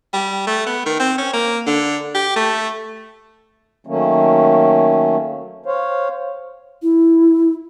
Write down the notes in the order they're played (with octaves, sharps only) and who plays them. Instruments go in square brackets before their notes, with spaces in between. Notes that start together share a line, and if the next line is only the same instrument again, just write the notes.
[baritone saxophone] G3
A3
B3
D#3
C4
C#4
A#3
D3
G4
A3
[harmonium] D#3 F#3 A3 A#3 C#4
C5 C#5 F5
[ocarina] E4